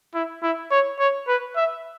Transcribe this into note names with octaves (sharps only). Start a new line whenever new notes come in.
E4
E4
C#5
C#5
B4
E5